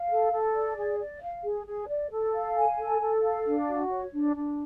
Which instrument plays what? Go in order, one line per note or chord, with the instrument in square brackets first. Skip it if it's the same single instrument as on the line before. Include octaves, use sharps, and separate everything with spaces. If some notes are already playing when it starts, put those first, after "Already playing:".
Already playing: [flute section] F5
A4
A4
D5
G#4
D5
F5
G#4
G#4
D5
A4
F5
G#5
A4
A4
F5
D4
F#4
C#5
D4
D4